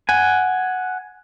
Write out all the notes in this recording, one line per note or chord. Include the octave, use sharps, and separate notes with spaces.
F#5 G#5